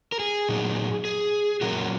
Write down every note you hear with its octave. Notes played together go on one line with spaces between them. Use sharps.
A#4
G#4
A#2 F#3 D#4
G#4
A#2 F#3 C#4 F#4 A#4